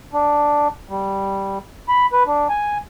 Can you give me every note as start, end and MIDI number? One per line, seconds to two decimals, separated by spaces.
0.13 0.68 62
0.89 1.58 55
1.89 2.06 83
2.13 2.23 71
2.26 2.48 62
2.49 2.78 80